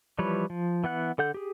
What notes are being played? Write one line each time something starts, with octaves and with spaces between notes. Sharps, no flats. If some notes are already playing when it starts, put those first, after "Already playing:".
E3 F3 G3 B4 C#5
F3
E3 B3 F#5 F#6
D3 A4 F#5 G6
G4 G#4